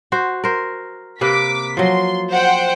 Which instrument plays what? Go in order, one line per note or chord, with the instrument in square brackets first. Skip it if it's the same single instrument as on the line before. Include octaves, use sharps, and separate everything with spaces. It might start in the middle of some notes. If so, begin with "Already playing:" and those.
[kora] F#4 C5
A#4 C5
[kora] C3 A#3 B4 [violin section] D6 B6
[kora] F3 F#3 [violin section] C6
[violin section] C5 F#5 G5